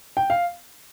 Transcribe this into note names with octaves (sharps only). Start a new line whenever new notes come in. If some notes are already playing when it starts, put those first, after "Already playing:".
G5
F5